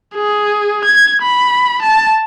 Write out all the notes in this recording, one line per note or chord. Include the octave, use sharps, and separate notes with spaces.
G#4
G#6
B5
A5